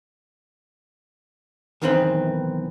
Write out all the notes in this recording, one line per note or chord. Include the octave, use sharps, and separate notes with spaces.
B1 D#3 E3 C4 A#5 B5